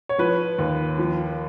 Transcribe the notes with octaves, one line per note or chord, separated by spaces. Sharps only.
C#5
F3 B4
D#2
F3